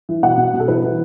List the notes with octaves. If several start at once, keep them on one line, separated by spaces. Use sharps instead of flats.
E3
B2 F#5
B2
B2
A4
E3 B4
E3